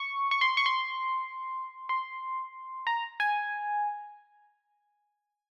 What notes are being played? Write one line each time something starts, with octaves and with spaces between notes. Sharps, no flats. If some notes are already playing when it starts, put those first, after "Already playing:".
Already playing: C#6
C#6
C6
C#6
C6
C6
A#5
G#5